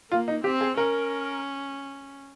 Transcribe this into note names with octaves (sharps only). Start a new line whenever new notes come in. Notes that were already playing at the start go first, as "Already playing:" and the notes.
A#3 F4
D#4
C4 G4
G#4
C#4 A#4